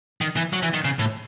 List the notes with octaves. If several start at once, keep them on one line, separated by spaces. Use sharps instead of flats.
D#3
E3
F#3
E3
D#3
C#3
A2